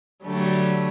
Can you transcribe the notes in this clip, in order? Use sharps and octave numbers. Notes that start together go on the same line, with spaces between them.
D3 F#3 G3 A3